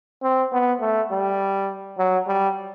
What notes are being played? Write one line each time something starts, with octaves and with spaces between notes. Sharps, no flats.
C4
B3
A3
G3
F#3
G3